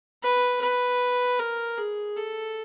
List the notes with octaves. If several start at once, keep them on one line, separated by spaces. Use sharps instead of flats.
B4
B4
A#4
G#4
A4